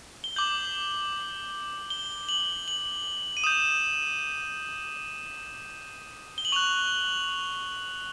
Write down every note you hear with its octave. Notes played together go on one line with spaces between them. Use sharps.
G7
D6 G6 F#7
G7
F#7
F#7
D#7
D#6 G6 E7
G7
F#7
C#6 F#6 F7